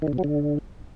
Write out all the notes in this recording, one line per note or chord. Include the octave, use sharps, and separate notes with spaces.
D#3
D3
B2
F#3
D3